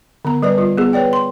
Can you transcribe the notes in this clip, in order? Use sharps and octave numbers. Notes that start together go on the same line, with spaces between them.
D3 B3 A#5
G3 B4 D5
G3 F4
B3 G#4
B4 C#5 D5 G5
C6